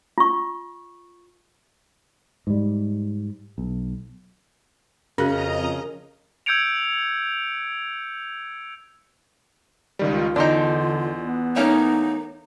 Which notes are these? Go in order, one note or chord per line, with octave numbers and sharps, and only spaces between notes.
F4 C#6
G#2 G3
B1
F2 C#3 C#4 F#4 G#4 A#4 D#5 A#5
E6 G6 G#6 C#7 D7 F7
C#2 D#3 G3
F4
E2 D3 D4 D#4 F4 C6 G6
B3
A3 A#3 C#4 D#4